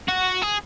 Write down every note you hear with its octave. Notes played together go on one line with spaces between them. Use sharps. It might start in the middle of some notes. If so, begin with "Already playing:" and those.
F#4
G#4